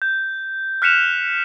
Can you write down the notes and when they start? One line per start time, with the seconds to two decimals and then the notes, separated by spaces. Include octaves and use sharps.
0.02 G6
0.82 F6 F#6 B6 C#7 E7 F7